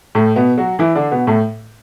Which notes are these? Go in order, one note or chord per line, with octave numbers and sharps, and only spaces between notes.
A2 A3
B2 B3
F#3 F#4
E3 E4
D3 D4
B2 B3
A2 A3